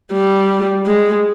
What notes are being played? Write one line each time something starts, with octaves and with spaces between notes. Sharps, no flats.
G3
G#3